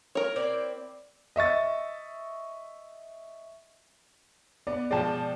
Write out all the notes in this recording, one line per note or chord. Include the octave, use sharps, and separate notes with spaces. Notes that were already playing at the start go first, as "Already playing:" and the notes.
A#4 C#5
C4 E4 D5
D#5 E5 C#6 A6
B3 D5
B2 F3 G#3 D5 G5 A5